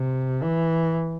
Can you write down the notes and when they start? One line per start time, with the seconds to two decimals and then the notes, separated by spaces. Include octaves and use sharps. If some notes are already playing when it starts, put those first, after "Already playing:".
Already playing: C3
0.43 E3